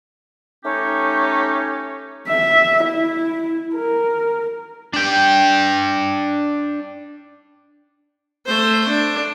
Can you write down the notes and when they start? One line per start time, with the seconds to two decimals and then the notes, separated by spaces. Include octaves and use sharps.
0.64 A3 C#4 D#4 G4 C#5
2.28 E5
2.84 E4
3.75 A#4
4.93 D4 G5
8.46 A3 C5
8.88 D4